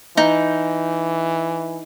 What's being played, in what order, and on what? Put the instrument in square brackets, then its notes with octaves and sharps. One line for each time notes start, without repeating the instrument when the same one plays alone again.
[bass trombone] E3 [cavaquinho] D#4